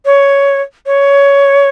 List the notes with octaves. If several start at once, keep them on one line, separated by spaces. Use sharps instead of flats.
C#5
C#5